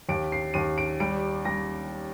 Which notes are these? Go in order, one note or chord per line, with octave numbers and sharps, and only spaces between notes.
D#2 D7
C7
D#2 D#7
D7
G3 D7
G3 A#6